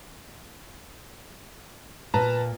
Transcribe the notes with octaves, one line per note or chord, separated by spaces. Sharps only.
A#2 B4 A5 A#5